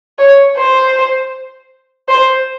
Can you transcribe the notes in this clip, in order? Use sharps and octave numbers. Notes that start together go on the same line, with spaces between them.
C#5
C5
C5